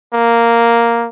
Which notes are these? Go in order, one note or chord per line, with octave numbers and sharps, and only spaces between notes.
A#3